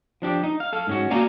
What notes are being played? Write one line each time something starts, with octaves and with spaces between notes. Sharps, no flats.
F3 D4 G4
D#4
F5
A4 F5
G#2 C#4 F#4
A#3 F#4 D5 F5 G#5 A#5